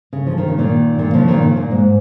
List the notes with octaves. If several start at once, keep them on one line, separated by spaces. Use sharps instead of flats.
C#3
F3
D#3
C#3
A#2 D#3
A#2 D#3
C#3 F3
A#2 D#3
C#3
A#2
G#2